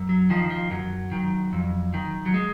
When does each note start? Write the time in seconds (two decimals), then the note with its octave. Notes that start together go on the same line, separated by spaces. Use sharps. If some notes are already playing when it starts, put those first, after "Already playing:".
Already playing: F#2
0.09 F#3
0.30 D#3 F3
0.50 F3
0.70 F#2 F#3
1.11 D#3
1.53 F2
1.94 D#3
2.26 F#3
2.34 G#3